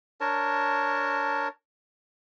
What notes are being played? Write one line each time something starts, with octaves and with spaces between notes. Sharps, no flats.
D4 A#4 C#5 A5